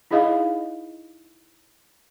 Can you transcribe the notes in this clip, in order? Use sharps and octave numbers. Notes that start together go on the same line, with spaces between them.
D#4 E4 G#4 D#5 F5